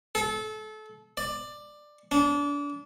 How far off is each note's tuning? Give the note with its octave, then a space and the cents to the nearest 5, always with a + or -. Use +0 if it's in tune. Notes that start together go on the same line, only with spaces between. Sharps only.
A4 -30
D5 +15
D4 -30